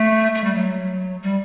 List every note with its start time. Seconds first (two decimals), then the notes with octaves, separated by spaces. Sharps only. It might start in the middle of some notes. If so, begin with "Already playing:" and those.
Already playing: A3
0.34 A3
0.44 G3
0.54 F#3
1.22 G3